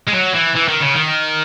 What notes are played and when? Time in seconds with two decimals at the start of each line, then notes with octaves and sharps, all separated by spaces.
0.08 G#3
0.14 F#3
0.35 E3
0.56 E3
0.69 D#3
0.81 C#3
0.94 D#3